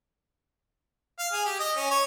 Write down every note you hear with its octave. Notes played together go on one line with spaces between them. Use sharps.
F5
G#4
G4
D#5
C#4
C#5